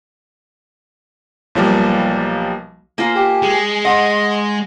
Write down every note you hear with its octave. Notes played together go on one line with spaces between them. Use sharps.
B1 F3 G3 A#3
A#3 F4 C5 G#5
G4
G#3
D#5 F#5 C6
C6